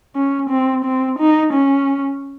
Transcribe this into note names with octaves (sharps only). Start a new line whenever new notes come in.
C#4
C4
C4
D#4
C#4